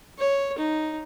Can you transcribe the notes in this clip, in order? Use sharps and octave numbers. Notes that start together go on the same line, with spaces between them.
C#5
D#4